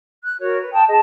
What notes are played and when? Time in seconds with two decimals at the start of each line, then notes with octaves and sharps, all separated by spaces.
0.24 F#6
0.39 F#4 A#4 C#5
0.59 B4
0.72 G5 A5 D#6
0.89 G#4 D#5 A5